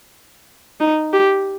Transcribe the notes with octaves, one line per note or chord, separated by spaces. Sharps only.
D#4
G4